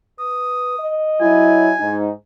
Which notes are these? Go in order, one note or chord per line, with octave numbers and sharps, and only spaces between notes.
B4 D#6
D#5
F#3 E4 G#5
G#2 D#4